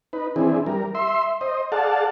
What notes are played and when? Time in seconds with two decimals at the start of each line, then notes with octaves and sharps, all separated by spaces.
0.13 D#4 B4
0.36 E3 C4 D4 E4 G#4
0.66 G3 A#4
0.95 E5 C6
1.41 C5 D#5
1.72 G#4 A4 D5 F5 F#5 A5